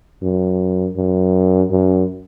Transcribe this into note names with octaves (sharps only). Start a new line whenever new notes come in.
F#2
F#2
F#2